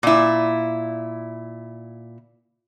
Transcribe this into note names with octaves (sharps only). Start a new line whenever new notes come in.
A#2 E4